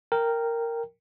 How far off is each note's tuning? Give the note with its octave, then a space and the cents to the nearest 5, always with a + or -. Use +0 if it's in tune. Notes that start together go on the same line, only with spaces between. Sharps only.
A#4 -10 G5 +5